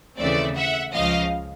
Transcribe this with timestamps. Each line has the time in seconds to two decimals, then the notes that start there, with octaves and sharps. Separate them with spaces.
0.19 D#2 C#3 E3 A3 C4 D5 E5
0.57 E5 F#5
0.93 C#2 C#3 F3 D#5 F5